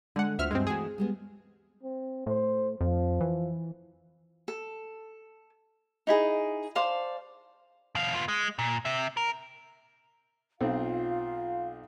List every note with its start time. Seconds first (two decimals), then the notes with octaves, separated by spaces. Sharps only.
0.16 D3 G#3 F#5
0.39 D2 F4 F#4 C5 E5 F6
0.51 G2 G#3 C4 D4 F#4
0.67 E3 A3 F#4 G#4
0.98 G3 G#3 B3
1.83 C4
2.26 A2 C5
2.81 F2 F3
3.21 E3
4.48 A4
6.07 D#4 E4 G#4
6.75 C5 D5 F5 A5
7.95 B2 F5
8.14 B3 F4
8.28 G#3
8.59 A#2
8.85 C3 E5
9.17 A#4
10.61 B1 C4 F4 F5